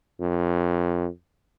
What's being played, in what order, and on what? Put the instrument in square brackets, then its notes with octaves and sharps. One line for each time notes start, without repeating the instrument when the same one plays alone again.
[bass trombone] F2